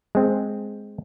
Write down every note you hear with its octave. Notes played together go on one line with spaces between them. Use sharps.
G#3 C4